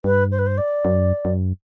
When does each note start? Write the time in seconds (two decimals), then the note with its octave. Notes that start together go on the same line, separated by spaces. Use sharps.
0.04 G2 B4
0.32 C5
0.39 B4
0.47 C5
0.58 D5
0.85 F#2
1.25 F#2